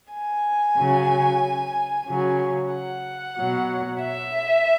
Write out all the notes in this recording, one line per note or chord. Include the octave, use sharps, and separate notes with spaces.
G#5
C#3 F#3
C#3 F#3
F#5
B2 F#3
E5